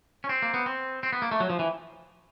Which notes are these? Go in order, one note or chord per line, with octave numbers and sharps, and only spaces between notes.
C#4
C4
A#3
B3
C4
C4
B3
A#3
A3
F#3
F3
E3